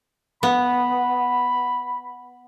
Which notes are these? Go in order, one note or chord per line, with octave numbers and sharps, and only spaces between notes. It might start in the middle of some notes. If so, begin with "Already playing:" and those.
B3 B5